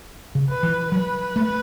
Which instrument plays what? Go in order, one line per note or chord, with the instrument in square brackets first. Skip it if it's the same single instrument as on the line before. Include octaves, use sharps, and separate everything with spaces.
[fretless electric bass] C#3
[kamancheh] B4
[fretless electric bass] E3
[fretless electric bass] F#3 [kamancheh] B4
[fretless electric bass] A3